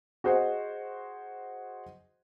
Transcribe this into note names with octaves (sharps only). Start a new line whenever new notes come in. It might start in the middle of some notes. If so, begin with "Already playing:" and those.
F#4 G#4 C5 D#5 F#5